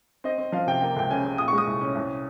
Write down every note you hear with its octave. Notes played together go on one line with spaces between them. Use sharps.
C4 D#5
C4
F3 F5
C3 G5
A#3 G5
C#2 G5
C#3 G#5
C#3
A#2 D#6
C#6
G#3
D#6
C2
C#4
C2